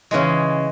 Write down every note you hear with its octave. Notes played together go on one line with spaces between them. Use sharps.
C#3 E3 G#3